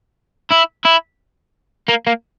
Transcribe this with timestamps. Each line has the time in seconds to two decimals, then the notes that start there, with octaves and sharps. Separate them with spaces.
0.51 E4
0.85 E4
1.89 A#3
2.07 A#3